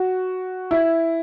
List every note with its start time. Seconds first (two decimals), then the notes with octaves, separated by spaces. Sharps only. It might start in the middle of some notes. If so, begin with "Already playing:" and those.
Already playing: F#4
0.71 E4